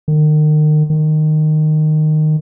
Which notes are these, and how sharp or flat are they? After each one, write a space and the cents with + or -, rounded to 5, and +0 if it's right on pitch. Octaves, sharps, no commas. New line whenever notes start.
D#3 -35
D#3 -15